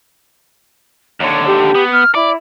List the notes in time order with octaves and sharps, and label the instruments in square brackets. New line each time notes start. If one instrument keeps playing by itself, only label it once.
[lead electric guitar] D#2 D3 [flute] C#5
[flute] G4
[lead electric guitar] B3
[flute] F6
[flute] E4 [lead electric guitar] D5